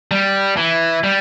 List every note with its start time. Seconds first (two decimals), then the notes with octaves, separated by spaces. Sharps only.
0.11 G3
0.57 E3
1.04 G3